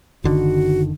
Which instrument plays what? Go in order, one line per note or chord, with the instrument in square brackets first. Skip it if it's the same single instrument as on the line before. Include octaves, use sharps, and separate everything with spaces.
[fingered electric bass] F#1 D3 D#3 [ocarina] F#4